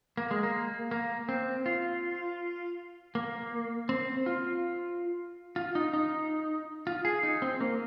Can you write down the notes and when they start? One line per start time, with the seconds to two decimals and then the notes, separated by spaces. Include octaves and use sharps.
0.17 A#3
0.31 G#3
0.43 A#3
0.91 A#3
1.29 C4
1.66 F4
3.15 A#3
3.89 C4
4.26 F4
5.56 F4
5.75 D#4
5.93 D#4
6.87 F4
7.05 G#4
7.23 D#4
7.42 C4
7.61 A#3